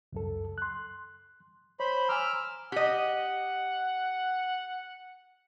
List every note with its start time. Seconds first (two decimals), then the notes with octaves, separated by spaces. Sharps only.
0.13 C#2 F#2 A4
0.58 C6 F#6
1.80 C5 C#5 B5
2.09 G#5 A#5 D6 E6 F6
2.72 G4 D#5 F#5